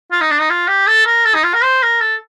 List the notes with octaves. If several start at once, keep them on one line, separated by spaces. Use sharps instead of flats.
F4
D#4
D4
D#4
F4
G4
A4
A#4
A4
D#4
F4
A#4
C5
A#4
A4